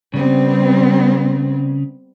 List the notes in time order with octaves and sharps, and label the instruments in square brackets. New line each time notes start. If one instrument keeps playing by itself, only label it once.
[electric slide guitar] C#3 [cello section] G3 B3 C4